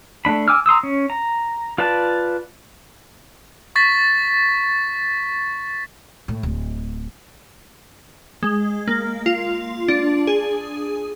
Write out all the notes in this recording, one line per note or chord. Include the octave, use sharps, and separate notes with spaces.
A3 A#3 D4 B5
G#5 D6 E6 F6
A#5 C6 D#6 E6
C#4
A#5
F4 B4 D5 A5
C#6 A6 B6
A2
D1
G#3
A#3
F4
D4
G#4